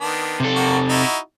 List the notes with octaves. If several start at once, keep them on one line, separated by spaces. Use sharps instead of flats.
D#3 B3 D4
C3 A4
A#3 F#4
D#4 E4 F#4